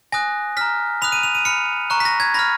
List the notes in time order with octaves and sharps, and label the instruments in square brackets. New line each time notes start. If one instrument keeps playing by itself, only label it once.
[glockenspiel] G#5 D#6 F#6 A#6
A#5 F6 B6
B5 D#6 F#6 F7
D#7
F7
D#7
B5 F6 C#7
A#5 C#6 F#6
B6
A#6
G#6
B5 F6 A#6